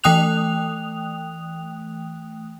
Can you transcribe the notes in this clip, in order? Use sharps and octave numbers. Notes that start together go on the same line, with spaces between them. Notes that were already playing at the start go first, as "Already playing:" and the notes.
E3 A3 G5 D#6 F#6 F7